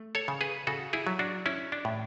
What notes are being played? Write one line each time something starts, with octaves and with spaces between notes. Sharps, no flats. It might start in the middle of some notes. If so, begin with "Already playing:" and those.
Already playing: A3
A4 C#5
C#3
G#4 B4
C#3 F#4 A4
E4 G#4
F#3
D4 F#4
C#4 E4
D4
A2